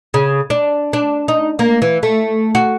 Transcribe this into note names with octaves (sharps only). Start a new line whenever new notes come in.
C#3
D4
D4
D#4
A#3
E3
A3
F#4